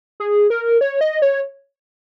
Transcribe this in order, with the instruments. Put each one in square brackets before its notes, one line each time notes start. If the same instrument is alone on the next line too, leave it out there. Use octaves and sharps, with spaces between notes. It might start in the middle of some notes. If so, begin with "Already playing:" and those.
[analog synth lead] G#4
A#4
C#5
D#5
C#5